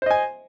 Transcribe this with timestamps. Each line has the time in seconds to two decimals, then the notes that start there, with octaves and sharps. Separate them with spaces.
0.02 C5
0.06 D#5
0.11 G#5